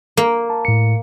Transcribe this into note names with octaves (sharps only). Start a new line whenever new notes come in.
A#3
A5
A2 C#7